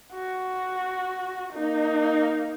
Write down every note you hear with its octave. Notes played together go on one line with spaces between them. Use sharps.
F#4
A#3 D#4